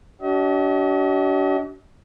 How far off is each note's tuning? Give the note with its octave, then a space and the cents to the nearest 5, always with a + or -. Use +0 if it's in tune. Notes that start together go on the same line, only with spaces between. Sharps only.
D4 -35 F#4 +45 D#5 +45